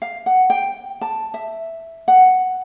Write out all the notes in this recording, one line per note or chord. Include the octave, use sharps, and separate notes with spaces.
F5
F#5
G5
A5
E5
F#5